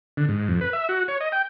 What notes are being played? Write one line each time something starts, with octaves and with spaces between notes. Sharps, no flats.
D3
G#2
F2
B4
E5
F#4
C#5
D#5
G5